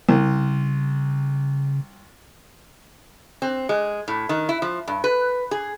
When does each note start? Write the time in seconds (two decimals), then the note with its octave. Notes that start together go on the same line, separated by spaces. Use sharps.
0.09 C2 C#3
3.42 C4
3.69 G#3
4.08 A2
4.29 D#3
4.49 E4
4.62 F3
4.88 G2
5.04 B4
5.51 G#4